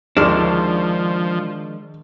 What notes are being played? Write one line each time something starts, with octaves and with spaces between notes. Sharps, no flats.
D2 D#3 F3 G#3 D4 D5 F6